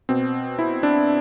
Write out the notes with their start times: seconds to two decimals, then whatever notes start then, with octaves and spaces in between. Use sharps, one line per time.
0.09 B2 C4
0.59 E4
0.83 D4